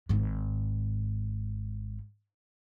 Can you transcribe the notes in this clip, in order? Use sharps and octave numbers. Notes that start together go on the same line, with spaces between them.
G#1 G#2